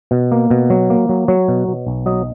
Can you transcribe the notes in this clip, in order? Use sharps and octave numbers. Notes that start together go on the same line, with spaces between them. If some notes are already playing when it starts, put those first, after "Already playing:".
B2
A#3
B2
F#3
A#3
F#3
F#3 C#5
B2
B2
B1
F#3 D#5